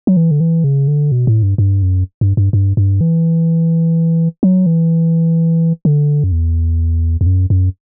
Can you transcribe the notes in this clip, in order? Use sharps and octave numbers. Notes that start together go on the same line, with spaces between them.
F#3
E3
D3
E3
C#3
D3
B2
A2
G2
G2
F#2
G2
G2
G2
G2
E3
F#3
E3
D3
F#2
E2
E2
F#2
F#2